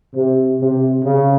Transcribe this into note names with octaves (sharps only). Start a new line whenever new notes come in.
C3
C3
C#3